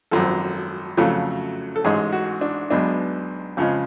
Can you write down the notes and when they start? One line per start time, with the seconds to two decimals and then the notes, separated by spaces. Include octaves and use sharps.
0.11 G#1 F#2 F3 A4
0.97 F2 C#3 F#3 A3
1.76 A4
1.84 A1 G#2 G#3 G#4
2.12 F#4
2.41 D4
2.70 B1 B2 G#3 D4
3.57 F2 C#3 F3 G#3